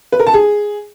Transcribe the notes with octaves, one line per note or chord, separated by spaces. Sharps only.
B4
A#4
A5
G#4